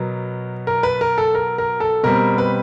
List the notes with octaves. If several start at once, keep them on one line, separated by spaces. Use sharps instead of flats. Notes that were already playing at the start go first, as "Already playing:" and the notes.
Already playing: B2 F#3 B3 A#4
A#4
B4
A#4
A4
A#4
A#4
A4
B2 G3 C4 A#4
B4